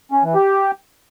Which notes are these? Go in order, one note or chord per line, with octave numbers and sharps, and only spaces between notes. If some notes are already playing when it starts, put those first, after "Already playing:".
C#4
E3
G4